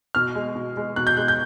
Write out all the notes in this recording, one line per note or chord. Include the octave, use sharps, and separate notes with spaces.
B2 F6
G#3
B2
G#3
B2 F#6
G6
G#3 F#6
G6